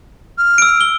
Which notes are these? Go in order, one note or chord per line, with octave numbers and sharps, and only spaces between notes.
F6
E6 D7
G7